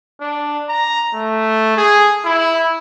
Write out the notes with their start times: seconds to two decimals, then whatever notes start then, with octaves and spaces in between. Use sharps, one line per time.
0.20 D4
0.69 A#5
1.14 A3
1.77 G#4
2.25 E4